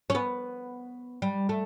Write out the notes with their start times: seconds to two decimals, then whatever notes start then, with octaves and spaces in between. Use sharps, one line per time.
0.10 C#4
0.15 B3
1.22 G3
1.49 A3